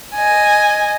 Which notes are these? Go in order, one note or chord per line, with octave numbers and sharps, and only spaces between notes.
D#5 G#5